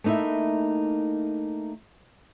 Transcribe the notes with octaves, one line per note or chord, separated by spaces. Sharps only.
A3 A#3 D#4 E4 E5